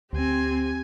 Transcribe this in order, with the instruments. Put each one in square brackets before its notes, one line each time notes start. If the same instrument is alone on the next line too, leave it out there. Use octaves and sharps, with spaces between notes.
[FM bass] D2 [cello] C4 [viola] G4 G#5